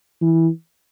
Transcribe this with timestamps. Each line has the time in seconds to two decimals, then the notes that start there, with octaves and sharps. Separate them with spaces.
0.21 E3